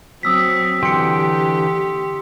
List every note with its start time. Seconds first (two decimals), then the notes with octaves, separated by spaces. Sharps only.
0.23 F#3 C4 D#6 E6 B6
0.83 D3 E3 G4 G5 C6 C#7